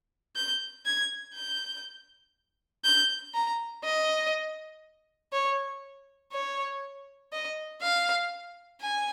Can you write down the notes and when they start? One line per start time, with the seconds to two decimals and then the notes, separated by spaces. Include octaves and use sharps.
0.36 G6
0.86 G#6
1.35 G6
2.85 G6
3.35 A#5
3.85 D#5
5.33 C#5
6.33 C#5
7.32 D#5
7.82 F5
8.81 G#5